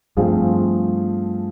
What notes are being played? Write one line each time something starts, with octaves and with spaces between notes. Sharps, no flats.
G2 F3 A3 C4 F4 G#4